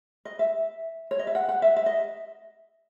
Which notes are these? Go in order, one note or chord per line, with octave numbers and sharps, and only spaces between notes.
D#5
E5
C#5
D#5
E5
F#5
F#5
E5
E5
D#5